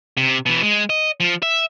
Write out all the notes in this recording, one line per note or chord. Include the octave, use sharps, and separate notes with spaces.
C3
B2 E3
G#3
D#5
F3
E5